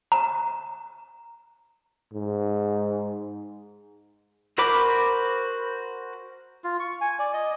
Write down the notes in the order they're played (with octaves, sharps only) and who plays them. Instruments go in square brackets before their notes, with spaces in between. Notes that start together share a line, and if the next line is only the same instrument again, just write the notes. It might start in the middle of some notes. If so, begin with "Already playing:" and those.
[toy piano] A#5
[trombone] G#2
[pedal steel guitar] F#4 A#4 C5 B5 D6
[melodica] F4
C#6
G#5
D5
D#5